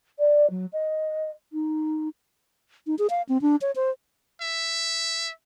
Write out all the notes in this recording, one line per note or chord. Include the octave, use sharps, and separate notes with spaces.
D5
F#3
D#5
D#4
D#4
G#4
F5
C4
D4
C#5
C5
E5